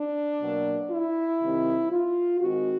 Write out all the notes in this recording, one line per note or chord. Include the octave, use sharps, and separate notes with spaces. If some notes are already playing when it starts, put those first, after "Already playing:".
Already playing: D4
B2 F#3 A#3
E4
C3 D#3 G3 C4
F4
D#3 G#3 C4 F#4